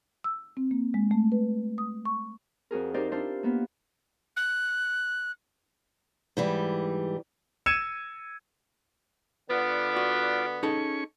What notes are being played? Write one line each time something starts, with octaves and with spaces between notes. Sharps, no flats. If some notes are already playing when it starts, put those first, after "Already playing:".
E6
C4
A#3
G#3
A3
B4
D#6
C#6
F2 F#4 G#4 A#4
D#4 G4 A#4 C5 D5
D4 E4 F4 C5
A#3 B3 B4
F#6
G#2 E3 G3
E6 G#6 C#7 D#7 E7
D3 B3 F4 D5
F#4
C#4 D#4 G#4 A4 C#6